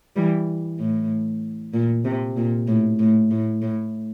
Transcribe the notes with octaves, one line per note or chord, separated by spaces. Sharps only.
E3 G3
A2
A#2
C3
A#2
A2
A2
A2
A2